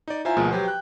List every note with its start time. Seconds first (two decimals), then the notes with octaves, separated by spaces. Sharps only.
0.08 D#4 D5
0.25 E4 F4 C5 E5 G#5 A#5
0.37 D2 B2 F3 G#3 A#3 A#4
0.51 F#3 G4 B4 C5
0.65 G5 F#6